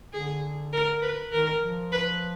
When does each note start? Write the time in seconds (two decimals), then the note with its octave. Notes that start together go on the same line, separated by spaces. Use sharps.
0.12 D3 G#4
0.73 A#4
1.02 B4
1.32 D#3 A#4
1.62 F3
1.92 B4